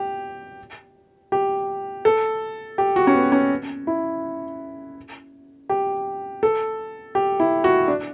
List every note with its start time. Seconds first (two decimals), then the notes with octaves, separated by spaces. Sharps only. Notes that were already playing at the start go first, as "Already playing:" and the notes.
Already playing: G4
1.32 G4
2.05 A4
2.78 G4
2.96 F#4
3.07 C#4
3.14 B3
3.32 C#4
3.87 E4
5.70 G4
6.43 A4
7.15 G4
7.40 E4
7.64 F#4
7.88 D4